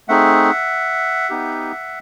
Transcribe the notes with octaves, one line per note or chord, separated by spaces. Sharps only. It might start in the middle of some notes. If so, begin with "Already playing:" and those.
A3 C4 D#4 G#4 E5 F#5
B3 D#4 G4